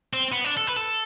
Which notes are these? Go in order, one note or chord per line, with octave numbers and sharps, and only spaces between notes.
C4
B3
D4
A4
B4
A4